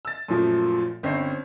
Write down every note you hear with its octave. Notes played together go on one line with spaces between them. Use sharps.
E6 A6
F#2 A#2 F3 A3
G1 C4 C#4 C7